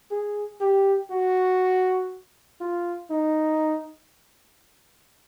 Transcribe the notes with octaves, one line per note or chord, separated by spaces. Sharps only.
G#4
G4
F#4
F4
D#4